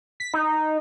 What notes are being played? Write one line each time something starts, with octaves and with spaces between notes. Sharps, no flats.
B6
D#4